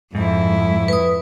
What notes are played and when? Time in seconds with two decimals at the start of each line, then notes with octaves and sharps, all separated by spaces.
0.15 F2 G#2 E4
0.88 B4 D#6